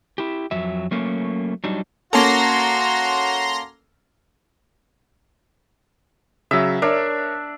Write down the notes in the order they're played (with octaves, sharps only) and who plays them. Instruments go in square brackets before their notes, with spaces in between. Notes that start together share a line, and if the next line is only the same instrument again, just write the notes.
[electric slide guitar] E4 G4
F2 F#3 E5
F#3 A3 A#3 C#4
F#3 G3 D4 D#4
[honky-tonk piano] A#3 C#4 A4 [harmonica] F#4 [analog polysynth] A#5 C6 A#6
[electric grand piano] C#3 F#3 [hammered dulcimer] E5
[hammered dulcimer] D4 [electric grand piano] A#4 C#5 E5